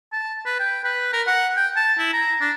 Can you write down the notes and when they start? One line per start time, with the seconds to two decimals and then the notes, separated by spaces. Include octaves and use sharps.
0.12 A5
0.46 B4
0.60 G5
0.84 B4
1.13 A#4
1.27 F#5
1.56 G5
1.76 A5
1.99 E4
2.13 A#5
2.41 D4